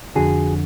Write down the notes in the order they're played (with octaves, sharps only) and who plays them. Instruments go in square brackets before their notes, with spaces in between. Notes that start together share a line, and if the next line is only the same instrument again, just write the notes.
[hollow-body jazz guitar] F2 D3 F#4 G#4